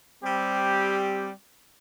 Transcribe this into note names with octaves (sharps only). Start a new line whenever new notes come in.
G3 C4 G4